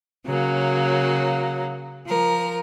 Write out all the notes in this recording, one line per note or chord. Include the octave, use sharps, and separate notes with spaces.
C#3 F#3 A#3
F3 A#4